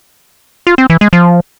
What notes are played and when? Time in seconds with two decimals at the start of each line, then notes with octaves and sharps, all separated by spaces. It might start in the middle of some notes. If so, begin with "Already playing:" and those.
0.67 F4
0.78 C4
0.90 E3
1.01 G#3
1.13 F3